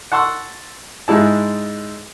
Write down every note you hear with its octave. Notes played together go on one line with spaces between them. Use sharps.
F#5 A5 C6 C#6 E6
G#2 G#3 E4 A5